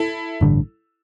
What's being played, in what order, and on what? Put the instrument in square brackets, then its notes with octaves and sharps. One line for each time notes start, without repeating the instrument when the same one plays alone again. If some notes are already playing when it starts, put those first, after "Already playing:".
Already playing: [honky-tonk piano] E4 A4
[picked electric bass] A1 G2 D3